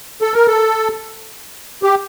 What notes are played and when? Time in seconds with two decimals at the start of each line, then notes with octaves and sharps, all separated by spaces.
0.22 A4
0.34 A#4
0.47 A4
1.83 G4